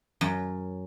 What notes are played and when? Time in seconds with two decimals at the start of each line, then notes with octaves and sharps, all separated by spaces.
0.21 F#2